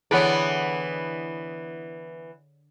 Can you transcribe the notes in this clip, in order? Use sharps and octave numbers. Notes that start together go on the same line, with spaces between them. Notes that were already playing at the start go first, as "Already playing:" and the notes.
D3 E3 B3 G#4 B4 C#5 D5